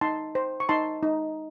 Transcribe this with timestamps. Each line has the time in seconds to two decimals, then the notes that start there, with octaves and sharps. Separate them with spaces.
0.01 D#4 A5 C6
0.35 C5
0.60 C#6
0.69 D#4 A5 C6
1.03 D#4